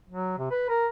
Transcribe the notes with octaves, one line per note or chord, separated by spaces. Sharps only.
F#3
C3
B4
A#4